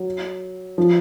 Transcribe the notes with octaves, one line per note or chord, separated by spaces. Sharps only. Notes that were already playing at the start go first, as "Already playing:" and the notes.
Already playing: F#3
F3